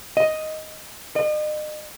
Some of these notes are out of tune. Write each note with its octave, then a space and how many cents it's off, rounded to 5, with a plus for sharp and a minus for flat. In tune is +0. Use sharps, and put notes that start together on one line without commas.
D#5 +5
D#5 -40